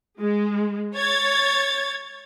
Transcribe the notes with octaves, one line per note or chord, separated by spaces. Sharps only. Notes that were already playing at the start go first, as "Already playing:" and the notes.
G#3
C#5 G#6 A6